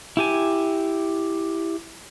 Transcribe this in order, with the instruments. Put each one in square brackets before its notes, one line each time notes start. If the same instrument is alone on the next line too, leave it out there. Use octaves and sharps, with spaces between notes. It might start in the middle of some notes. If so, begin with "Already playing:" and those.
[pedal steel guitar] E4 G4 G#5